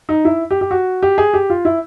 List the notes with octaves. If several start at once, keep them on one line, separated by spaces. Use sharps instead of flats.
D#4
E4
G4
G4
F#4
G4
G#4
G4
F4
E4